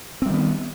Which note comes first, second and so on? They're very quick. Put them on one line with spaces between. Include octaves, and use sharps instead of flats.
C4 G3 D#3 B3